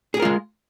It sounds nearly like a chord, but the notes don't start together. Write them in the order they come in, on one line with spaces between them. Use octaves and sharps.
G#4 G4 A#4 F4 G#3